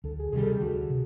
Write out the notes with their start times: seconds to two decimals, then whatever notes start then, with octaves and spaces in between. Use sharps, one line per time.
0.04 D2 A4
0.19 G#4
0.32 C3 D#3 G3 G#4
0.42 A4
0.48 G#4
0.61 D2 F#4
0.90 C3